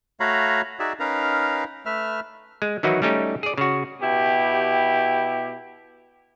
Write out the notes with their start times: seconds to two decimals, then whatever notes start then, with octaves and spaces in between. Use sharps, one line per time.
0.20 A3 F#4 C#5 F5 A#5 B5
0.79 D#4 F#4 G#4 D5 E5
1.00 C#4 D#4 A#4 B4 F5 A#5
1.86 A3 B4 E5 F6
2.62 G#3
2.83 D#3 E3 F#3 D#4 E4 F#4
3.02 G3 A3 C#4 D#4 G4
3.43 G#4 D5
3.58 C#3 F#4
4.01 B2 E4 G4